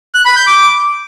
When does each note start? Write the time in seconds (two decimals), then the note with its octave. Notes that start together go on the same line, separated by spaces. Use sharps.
0.15 F#6
0.25 B5
0.36 G6
0.47 D6